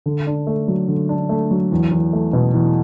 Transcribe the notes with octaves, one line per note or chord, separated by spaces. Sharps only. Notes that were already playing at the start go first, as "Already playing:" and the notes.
D3
D4
A3
F#3
D3
D4
A3
F#3
E2
E2
A3
B2
E2